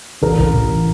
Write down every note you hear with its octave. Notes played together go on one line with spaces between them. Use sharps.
A1 A#4
A1
A1